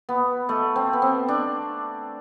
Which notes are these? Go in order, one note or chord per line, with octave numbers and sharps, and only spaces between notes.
B3
A3
C4
B3
C4
D4